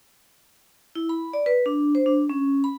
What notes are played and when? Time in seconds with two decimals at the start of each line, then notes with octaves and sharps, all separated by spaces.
0.95 E4
1.09 B5
1.33 D5
1.46 B4
1.66 D4
1.95 C5
2.06 D4
2.30 C#4
2.64 B5